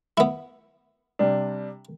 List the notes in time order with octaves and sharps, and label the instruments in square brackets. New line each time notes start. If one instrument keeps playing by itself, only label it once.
[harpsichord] B3 E4
[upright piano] C3 G3 D4